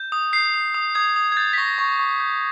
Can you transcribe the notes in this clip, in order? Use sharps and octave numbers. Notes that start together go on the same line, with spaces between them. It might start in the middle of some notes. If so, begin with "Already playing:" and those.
Already playing: G6
D#6
G6 C7
D#6
D#6
D#6 G#6
D#6
G#6
G6 A6
B6
C#6 A#6
C#6
C#6
G6